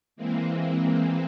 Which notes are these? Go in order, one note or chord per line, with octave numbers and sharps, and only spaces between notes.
E3 G#3 A#3 C4